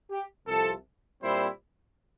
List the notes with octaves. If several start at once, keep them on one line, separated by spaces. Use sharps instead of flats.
G4
C2 C3 F3 A4
A#2 G3 C4 E4 C5